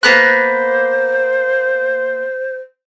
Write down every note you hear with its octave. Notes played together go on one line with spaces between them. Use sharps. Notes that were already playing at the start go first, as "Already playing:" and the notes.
A#3 B3 C5 F#6